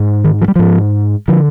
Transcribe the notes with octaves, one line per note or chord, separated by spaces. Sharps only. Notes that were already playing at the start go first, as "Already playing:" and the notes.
Already playing: G#2
D#3
F3
G3
G#2 F3
D3 F3